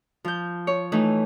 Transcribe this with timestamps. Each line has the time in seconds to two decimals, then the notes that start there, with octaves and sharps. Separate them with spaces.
0.24 F3 G6
0.67 C#5
0.92 E3 A3 D#4